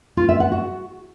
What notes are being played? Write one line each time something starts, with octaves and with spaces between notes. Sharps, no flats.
F4
E5
F#5
F#4